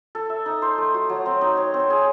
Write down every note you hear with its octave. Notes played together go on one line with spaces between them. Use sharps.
A4
E5
D#4
C5
A3
F#4
F#3
C4
D#4
C#5
C4
G#4